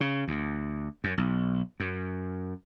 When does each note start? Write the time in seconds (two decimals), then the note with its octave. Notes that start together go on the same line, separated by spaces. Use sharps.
0.01 C#3
0.28 D2
1.04 F#2
1.18 B1
1.80 F#2